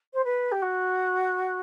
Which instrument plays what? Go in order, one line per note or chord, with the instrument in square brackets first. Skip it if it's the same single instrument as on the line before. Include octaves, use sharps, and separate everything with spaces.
[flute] C5
B4
G4
F#4